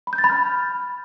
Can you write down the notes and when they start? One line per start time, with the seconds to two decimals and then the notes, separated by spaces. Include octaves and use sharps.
0.07 B5
0.13 G6
0.18 A6
0.24 B5
0.30 F6